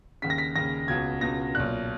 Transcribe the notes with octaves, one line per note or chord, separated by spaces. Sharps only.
D#2 C#3 B6
A#6
B6
D#2 C#3 A#6
C#2 B2 G#6
C#2 B2 A#6
B1 A#2 F#6